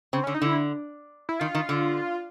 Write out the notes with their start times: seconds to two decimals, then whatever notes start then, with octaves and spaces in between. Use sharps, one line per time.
0.13 C#3 C4
0.24 D3 C#4
0.34 D#4
0.42 D3 E4
1.29 E4
1.40 D#3 F4
1.55 D#3
1.69 D3